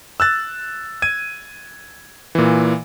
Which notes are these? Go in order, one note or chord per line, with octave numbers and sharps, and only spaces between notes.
E6 F#6 A6
G#6 D#7
A#2 E3